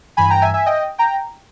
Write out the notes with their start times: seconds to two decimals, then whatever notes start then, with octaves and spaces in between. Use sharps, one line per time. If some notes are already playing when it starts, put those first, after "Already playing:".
0.17 G2 E3 G#5 B5
0.30 G5 A#5
0.41 E5 G#5
0.54 E5 G#5
0.66 D#5 G5
0.98 G5 A#5